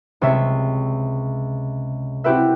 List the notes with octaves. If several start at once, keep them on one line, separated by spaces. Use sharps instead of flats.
C#2 C3 C#5 E5
C4 E4 F#4 G4 B4 E5